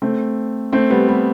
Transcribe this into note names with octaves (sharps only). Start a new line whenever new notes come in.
A3 C4
A3 C4
G3 B3
G3 B3